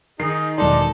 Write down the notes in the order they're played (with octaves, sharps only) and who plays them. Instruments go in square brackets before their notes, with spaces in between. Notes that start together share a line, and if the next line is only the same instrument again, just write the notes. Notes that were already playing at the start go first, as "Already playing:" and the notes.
[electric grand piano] D#3 [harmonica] D#4 G#4 [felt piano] C7
[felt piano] E1 D#3 [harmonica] D4 D5 C6 [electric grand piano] D#4 [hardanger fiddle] A4